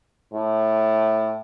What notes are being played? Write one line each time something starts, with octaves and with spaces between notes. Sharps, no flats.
A2